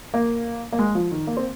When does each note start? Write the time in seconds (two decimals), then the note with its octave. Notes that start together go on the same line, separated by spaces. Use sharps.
0.14 A#3
0.73 A#3
0.79 G#3
0.95 F3
1.11 D#3
1.27 A#3
1.37 C4